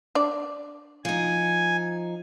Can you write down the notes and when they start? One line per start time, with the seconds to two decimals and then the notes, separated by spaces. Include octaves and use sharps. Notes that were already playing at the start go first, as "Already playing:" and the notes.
0.15 D4 D5
1.05 F3 D#4 G#5